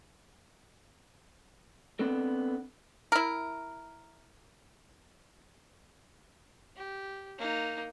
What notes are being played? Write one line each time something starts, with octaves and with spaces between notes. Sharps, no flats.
B3 C4 D4 A4
E4 A#4
G4
A#3 D#4